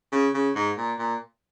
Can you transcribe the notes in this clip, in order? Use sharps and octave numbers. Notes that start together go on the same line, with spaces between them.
C#3
C#3
G#2
A#2
A#2